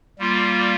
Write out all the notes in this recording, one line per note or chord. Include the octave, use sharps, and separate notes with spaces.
G3 A#3 F4